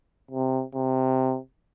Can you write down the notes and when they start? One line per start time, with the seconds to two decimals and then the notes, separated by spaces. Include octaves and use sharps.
0.31 C3
0.75 C3